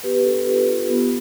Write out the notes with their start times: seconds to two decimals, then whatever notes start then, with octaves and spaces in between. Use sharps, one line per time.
0.04 B3 G4 B4
0.14 G4 B4
0.25 D4 A4
0.36 G4 B4
0.47 F4 G4
0.69 F4
0.89 B3